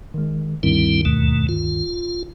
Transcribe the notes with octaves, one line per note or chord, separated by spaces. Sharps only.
D#3 G#3
D2 G2 D#3 G3 C4 E4
D#2 B2 A3
F4